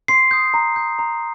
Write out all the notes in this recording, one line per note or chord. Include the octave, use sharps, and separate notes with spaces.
C6 C7
D#6 G6
A#5
D#6 G6
A#5